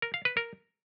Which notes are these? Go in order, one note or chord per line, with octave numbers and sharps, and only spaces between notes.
A#4
F5
B4
A#4